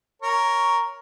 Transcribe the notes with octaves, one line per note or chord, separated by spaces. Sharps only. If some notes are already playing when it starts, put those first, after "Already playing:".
A#4 C#5